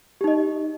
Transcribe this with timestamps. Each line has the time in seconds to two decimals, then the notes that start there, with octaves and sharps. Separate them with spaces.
0.21 G4
0.24 D#4
0.28 D#5